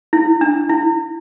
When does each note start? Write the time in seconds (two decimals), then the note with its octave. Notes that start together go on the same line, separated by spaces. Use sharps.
0.13 E4
0.41 D4
0.69 E4